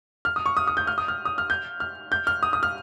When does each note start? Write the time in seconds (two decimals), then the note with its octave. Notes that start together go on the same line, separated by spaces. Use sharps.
0.25 F6
0.36 D#6
0.46 C#6
0.57 D#6
0.67 D#6
0.77 G6
0.87 F6
0.98 D#6
1.08 F6
1.25 D#6
1.38 F6
1.50 G6
1.80 F6
2.12 G6
2.27 F6
2.43 D#6
2.53 D#6
2.63 F6